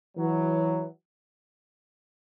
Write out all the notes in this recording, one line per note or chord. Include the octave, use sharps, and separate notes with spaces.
E3 F#3